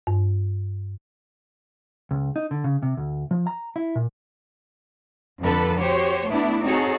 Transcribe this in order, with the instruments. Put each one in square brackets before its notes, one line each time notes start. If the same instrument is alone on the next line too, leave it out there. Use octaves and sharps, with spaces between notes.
[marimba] G2
[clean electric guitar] C#2
D#4
D3
C#3
C3
D2
F3
A#5
E4
A#2
[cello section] F2 D3 F3 A4 B4
F#4 G4 C5 C#5
A3 B3 D4 E4
C4 D#4 F#4 G#4 A4 C#5